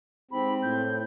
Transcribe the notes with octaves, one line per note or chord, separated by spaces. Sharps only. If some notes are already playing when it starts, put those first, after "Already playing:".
G#2 C4 G4 B5
A2 G6